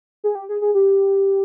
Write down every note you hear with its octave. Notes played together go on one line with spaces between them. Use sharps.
G#4
G4
G#4
G#4
G4